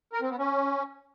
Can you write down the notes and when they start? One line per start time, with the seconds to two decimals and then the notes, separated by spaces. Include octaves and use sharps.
0.13 A#4
0.21 C4
0.30 B3
0.39 C#4